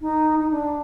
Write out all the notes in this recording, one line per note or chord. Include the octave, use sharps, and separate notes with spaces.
D#4
D#4
D4